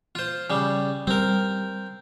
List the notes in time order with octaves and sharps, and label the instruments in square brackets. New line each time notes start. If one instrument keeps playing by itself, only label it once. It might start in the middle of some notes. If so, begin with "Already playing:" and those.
[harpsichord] F4 C5
C#3 G3
[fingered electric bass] G3 [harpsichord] C4 A#4